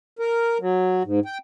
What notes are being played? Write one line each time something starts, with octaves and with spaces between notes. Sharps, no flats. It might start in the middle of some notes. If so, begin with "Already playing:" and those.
A#4
F#3
G#2
G5